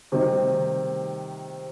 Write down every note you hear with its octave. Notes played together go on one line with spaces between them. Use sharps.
C3 D#3 G3 C4 D#4